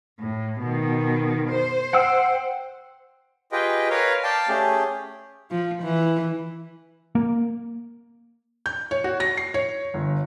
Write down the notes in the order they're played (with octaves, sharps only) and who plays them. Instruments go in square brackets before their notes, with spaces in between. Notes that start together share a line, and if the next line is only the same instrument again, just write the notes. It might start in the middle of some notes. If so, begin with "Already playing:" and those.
[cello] A2
B2 D#3
C5
[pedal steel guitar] F#5 G5 E6
[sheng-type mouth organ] F4 G4 G#4 B4 D#5 G5
A#4 B4 C#5 F5
D5 F5 G5 A5
A3 C#4 G4 G#4
[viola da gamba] F3
E3
[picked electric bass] A#3
[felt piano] G6
C#5
F#4
A#6
C7
C#5
G1